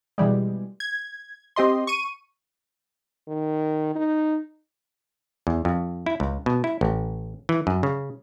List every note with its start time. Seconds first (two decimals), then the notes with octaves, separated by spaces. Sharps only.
0.18 B2 E3 G3 G#3
0.80 G#6
1.56 C4 G4 D#5 C6
1.87 C#6 D#7
3.28 D#3
3.96 D#4
5.47 E2
5.65 F2
6.06 E4
6.20 C#2
6.46 B2
6.64 E4
6.81 A1
7.49 E3
7.67 F#2
7.83 C#3